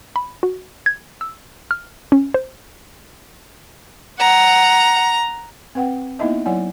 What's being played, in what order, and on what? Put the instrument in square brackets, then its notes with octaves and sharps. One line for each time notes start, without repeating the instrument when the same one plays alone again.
[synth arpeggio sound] B5
F#4
G#6
E6
F6
C#4
C5
[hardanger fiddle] F#5 [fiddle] A#5
[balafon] C4 B4 F#5 G5
A#3 B3 D#4 E4 D#5 E5
F#3 E4 C#5 D5 F#5 G#5